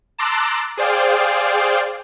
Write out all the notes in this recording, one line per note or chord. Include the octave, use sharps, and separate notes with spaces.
A5 A#5 C6 D6 E6 F#6
G#4 C5 D5 F5 G5